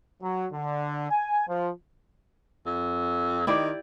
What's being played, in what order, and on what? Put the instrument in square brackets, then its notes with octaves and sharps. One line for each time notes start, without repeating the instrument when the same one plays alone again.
[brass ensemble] F#3
D3
G#5
F3
[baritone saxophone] F2
[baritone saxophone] D#3 [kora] E4 G4 D5